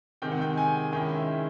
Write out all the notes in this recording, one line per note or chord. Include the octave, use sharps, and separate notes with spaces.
C3 D#3 G#3 G5
F#5
G5
G#5
D#3 G#3 C#4 E4 G5
E5